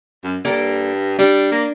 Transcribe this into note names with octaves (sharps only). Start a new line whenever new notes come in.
F#2
G2 A#3 A4 D5
G3 D4
A#3